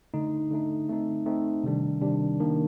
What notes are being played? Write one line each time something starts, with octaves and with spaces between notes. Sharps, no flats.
D3 A3 D#4
D3 A3 D#4
A3 C4 D#4
A3 C4 D#4
C3 D#3 G3 D4
C3 D#3 G3 D4
D#3 A#3 D4